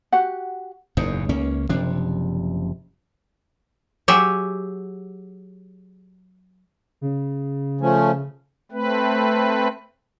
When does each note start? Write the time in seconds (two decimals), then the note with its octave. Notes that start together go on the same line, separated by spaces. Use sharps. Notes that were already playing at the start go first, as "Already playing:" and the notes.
0.12 F#4 G4 F#5
0.97 F#1 E2 A#2 D#4
1.29 C#2 A#3 C#4
1.69 F#1 C3 F3 D4
4.08 F#3 G4 G#4 E5
7.01 C#3
7.81 F3 A3 C#4
8.72 A3 C4 B4